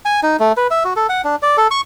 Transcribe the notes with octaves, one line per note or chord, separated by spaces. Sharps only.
G#5
D#4
A3
B4
E5
F#4
A4
F#5
D4
D5
A4
C#6